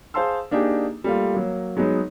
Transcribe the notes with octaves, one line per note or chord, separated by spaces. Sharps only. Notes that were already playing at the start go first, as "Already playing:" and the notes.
G#4 C5 F5 A5 C6 E6
A#3 D4 D#4 G4 G#4
G3 A3 A#3 F4
F#3 A#3
F#3 G#3 B3 D#4